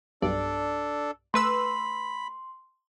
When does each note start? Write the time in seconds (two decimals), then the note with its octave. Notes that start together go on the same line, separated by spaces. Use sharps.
0.22 B1 G2 D4 A4 D5
1.34 A3 B4 B5 C6 E6